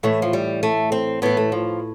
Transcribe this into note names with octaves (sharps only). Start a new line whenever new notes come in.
A2 E3 A3
F3
G3
A3
C4
A2 E3 B3
A3
F3